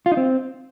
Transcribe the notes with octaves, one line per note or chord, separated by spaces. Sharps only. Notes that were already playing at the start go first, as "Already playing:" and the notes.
F4
D#4
C4